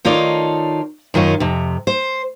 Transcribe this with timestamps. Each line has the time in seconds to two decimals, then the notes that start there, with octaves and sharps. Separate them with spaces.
0.05 D#3 D#4 F4 A4 C#5 D5
1.14 F#2 D#3 F4 C#5
1.40 F2 C3
1.87 C5